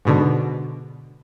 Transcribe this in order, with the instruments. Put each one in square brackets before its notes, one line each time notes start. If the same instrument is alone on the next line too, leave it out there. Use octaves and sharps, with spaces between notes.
[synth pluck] G#2 B2 D3